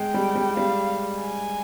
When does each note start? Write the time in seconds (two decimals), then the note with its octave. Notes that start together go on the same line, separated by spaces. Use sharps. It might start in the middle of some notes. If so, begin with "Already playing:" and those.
Already playing: G#3 G5
0.14 G3
0.35 G3
0.57 G3 F5
1.21 G#5